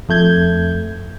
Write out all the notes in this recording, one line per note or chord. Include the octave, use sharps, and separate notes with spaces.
F2 A3 G6 G#6